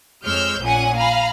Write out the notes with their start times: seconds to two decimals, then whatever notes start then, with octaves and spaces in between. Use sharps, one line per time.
0.24 F2 G#3 C#5 E6 F6 G6
0.61 A#1 A#2 C#4 F#5 G#5
0.97 F5 G#5 A#5 B5